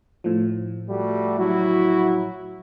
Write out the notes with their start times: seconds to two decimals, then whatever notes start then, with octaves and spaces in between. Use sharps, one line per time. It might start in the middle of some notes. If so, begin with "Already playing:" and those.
0.24 A2 F3
0.88 G3 A3 F#4
1.39 F#3 E4 F#4